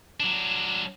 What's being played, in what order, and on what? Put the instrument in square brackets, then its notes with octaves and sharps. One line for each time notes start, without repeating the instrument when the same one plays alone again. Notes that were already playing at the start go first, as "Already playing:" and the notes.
[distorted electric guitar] F#3 D4